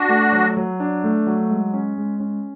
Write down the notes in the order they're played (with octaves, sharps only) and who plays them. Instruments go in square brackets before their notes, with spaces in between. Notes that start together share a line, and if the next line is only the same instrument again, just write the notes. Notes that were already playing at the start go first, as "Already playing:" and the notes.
Already playing: [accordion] D4 F#4
[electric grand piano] A3
F#3
F#3
D4
A3
F#3
G#3
C#4
G#3
C#4